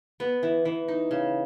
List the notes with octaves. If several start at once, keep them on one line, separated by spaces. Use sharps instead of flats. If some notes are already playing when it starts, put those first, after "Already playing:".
B3
E3
E3
D#4
C#3